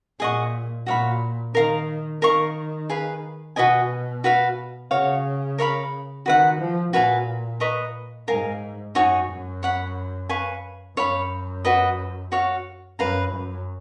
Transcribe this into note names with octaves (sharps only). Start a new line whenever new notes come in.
A#2 G#4 D#5 F#5 C#6
A#2 F#4 C#5 F5 B5
D#3 A#4 F5 A#5
D#3 A#4 F5 A#5 C#6
G#4 B4 F5 B5
B2 F#4 B4 D#5 G#5
F#4 B4 F5 B5
C#3 F#4 C#5 F5
A#4 C#5 F5 B5
D#3 F#4 B4 F#5
F3
A#2 F#4 B4 F5 G#5
B4 D#5 A#5 C#6
G#2 A#4 F5 G#5
F#2 D#4 F#4 C#5 G#5
F#2
C#5 F#5 B5
B4 F5 G#5 C#6
F#2 C#5 F5 B5
F#4 B4 D#5
F#4 C#5 F5
F#2 B4 F5 A#5
F#2